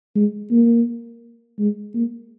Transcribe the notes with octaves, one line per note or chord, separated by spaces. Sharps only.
G#3
A#3
G#3
A#3